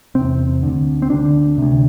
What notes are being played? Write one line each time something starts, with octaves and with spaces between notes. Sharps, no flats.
E2 C3 C4
D2 D3
C4
D2 D3 D4
D2 C3